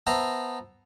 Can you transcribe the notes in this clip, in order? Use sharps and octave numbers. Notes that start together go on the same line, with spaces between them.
B3 C5 E5 A5 A#5